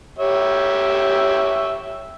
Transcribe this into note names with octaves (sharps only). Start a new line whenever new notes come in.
G4 C#5 E5